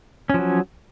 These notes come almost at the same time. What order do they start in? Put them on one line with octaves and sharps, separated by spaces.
C#4 F3 F#3